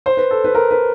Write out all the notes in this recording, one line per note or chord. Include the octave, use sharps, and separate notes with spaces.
C5
B4
A4
B4
A#4
B4